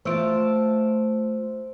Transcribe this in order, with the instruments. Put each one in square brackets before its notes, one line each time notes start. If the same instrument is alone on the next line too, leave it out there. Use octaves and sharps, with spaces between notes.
[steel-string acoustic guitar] A3 F4 A5 [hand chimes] C5 E6 D7